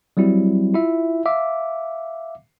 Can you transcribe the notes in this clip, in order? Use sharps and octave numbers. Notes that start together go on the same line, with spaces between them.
F#3 G3 C4 E4 F#4
E4 F4 E5
E5 F5 D6